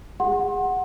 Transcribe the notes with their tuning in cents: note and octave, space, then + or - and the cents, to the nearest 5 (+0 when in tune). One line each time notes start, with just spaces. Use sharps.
G#4 -35 F#5 +0 C6 +35